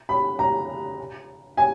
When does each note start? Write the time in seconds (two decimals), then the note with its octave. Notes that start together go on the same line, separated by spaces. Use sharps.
0.09 B5
0.39 A#5
1.57 G#5